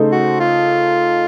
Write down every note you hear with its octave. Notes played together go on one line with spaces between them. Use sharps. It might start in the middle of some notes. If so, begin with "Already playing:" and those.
Already playing: C#3 A3 D#4 A4 C5
F#4
F4